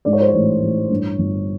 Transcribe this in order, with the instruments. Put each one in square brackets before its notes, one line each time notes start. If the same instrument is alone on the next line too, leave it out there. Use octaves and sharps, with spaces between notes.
[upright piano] G#2 D5
C#5
C5
C#5
A1
A1
G2
G1